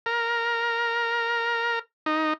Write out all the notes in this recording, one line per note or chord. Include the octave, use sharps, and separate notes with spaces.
A#4
D#4